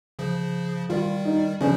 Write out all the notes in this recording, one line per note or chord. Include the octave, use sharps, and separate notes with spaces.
C#3 F3
D#3 G3 F4
D#4
C#3 F3 C#4